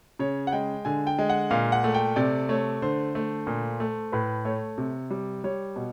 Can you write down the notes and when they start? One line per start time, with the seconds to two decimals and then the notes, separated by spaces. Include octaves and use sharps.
0.19 C#3 C#5
0.47 F#5
0.52 G#3 G5
0.85 D3 G#5
1.07 G5
1.19 G#3
1.29 F#5
1.51 A#2 F5
1.72 F#5
1.84 A3
1.94 G5
2.16 C3 D5
2.49 A3 C#5
2.82 D3 C5
3.15 A3
3.47 A#2
3.80 A3
4.12 A2 B4
4.45 A3 C#5
4.78 C3
5.11 G3
5.44 G3 C#5
5.76 B2